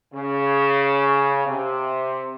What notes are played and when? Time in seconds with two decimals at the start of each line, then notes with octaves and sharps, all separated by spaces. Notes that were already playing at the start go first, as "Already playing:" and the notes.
0.14 C#3
1.48 C3